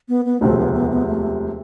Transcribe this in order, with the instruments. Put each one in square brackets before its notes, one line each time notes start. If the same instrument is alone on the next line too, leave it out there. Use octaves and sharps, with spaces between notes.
[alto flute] B3
B3
[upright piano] E1 D2 C3 F3 C4 [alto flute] A3
[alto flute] B3
B3
B3
A3